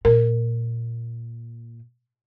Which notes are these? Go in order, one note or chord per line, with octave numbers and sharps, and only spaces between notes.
A#2 A#4